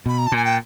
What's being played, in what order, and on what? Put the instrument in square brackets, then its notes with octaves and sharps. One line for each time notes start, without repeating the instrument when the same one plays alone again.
[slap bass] B2 [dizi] B5
[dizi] A#5
A5
[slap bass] A#2 [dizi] G#5
[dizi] G5